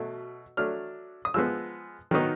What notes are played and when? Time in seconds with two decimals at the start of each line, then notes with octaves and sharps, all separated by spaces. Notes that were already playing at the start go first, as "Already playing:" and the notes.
Already playing: B2 F#3 A3
0.57 F#3 A3 D4 F6
1.25 D#6
1.34 F3 G#3 B3 E6
2.11 D#3 F#3 B3 D#4